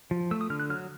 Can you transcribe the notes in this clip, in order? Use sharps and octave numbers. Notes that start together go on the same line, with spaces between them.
F3
A3 E6
D#6
D3 F6
F#6
F#3 F6